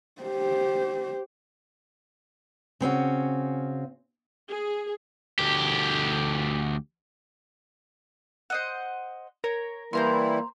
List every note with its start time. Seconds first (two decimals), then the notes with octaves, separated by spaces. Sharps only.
0.21 G4 C5
2.80 C#3 C4 C#4 F#4
4.49 G#4
5.39 D2 G4
8.50 C5 D#5 F#5
9.44 A#4 C#5
9.93 E3 G3 A#3 E4 C5 A#5 C6